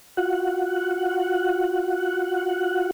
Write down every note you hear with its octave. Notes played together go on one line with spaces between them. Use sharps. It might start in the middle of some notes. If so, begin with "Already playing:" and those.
F4 F#4 F#5